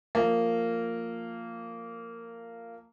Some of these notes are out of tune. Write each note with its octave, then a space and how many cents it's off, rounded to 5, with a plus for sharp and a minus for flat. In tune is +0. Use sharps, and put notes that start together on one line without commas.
F3 +5 A#3 -15